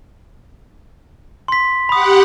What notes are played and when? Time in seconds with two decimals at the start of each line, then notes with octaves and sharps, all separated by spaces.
1.48 C6 B6
1.89 G4 F#5 B5 D#6